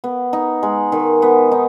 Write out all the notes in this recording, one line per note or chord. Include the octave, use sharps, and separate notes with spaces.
B3
D#4
G#3
D#3
B3
D#4